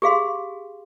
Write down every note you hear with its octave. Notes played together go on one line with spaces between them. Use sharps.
G4 G#4 F5 C6